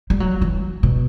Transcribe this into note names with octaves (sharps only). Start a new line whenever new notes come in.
G3
F#3
E3
B2